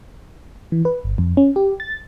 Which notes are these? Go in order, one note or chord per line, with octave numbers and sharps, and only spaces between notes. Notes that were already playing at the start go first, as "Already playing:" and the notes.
E3
B4
G1
F2
C#4
G4
A6